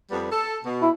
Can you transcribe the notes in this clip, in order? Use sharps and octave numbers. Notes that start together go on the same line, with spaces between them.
F2 G3 B3
A4
B2
E4